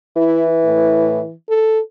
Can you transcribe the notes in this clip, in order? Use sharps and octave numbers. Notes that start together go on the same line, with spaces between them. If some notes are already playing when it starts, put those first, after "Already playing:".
E3 E4
A2
A4